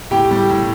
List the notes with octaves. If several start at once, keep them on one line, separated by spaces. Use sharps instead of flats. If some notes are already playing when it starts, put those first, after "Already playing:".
A2 G4 G5
G3
A2